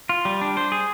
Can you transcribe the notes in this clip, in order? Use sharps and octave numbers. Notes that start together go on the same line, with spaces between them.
F4
G3
D4
C5
G#4